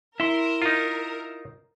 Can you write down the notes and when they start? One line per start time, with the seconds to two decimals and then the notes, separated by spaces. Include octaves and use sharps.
0.20 E4 A#4 E5 C6
0.62 D#4 F4